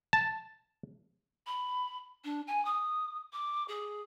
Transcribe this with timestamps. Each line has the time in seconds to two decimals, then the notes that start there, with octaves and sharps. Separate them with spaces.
0.13 A5
1.46 B5
2.24 D4
2.47 G#5
2.64 D#6
3.32 D6
3.68 G#4